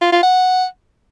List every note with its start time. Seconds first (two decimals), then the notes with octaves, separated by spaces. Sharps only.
0.02 F4
0.12 F4
0.23 F#5